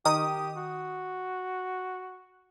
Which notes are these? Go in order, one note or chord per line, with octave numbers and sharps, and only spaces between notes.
D#3 G4 D#6
F#4